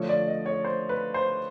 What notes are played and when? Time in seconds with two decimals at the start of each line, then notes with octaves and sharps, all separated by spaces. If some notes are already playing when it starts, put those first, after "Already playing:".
Already playing: D3 F3 A3 C#5
0.09 D5
0.28 D#5
0.46 C#5
0.65 C5
0.89 B4
1.14 C5